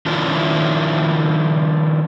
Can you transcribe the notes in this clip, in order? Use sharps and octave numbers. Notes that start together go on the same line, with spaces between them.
D#3 F3 C#4 D4 E4 F4